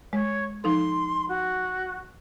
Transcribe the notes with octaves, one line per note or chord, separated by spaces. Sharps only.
G#3 C#5
F3 D#4 A4 C6
F#4